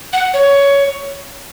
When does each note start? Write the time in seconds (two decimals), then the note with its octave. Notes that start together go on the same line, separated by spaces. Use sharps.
0.13 F#5
0.34 C#5